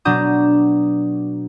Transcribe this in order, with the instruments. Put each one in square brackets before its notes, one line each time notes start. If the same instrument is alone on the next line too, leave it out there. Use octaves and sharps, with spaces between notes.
[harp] B2 F#3 D4 A#5 D#6 G6